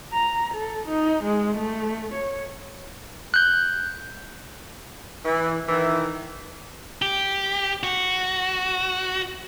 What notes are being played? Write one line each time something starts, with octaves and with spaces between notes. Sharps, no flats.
A#5
A4
D#4
G#3
A3
C#5
F#6 G6
E3
D#3 E3
G4
F#4